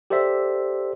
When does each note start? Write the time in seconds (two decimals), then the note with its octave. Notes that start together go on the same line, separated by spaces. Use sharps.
0.10 G4 A4 C5 D5 E5